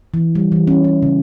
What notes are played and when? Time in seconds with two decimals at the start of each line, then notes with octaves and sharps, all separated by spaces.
0.14 E3
0.35 G3
0.52 E3
0.67 C#4
0.84 E4
1.03 C#3